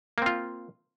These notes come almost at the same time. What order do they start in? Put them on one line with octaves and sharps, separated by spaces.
A#3 C4 F4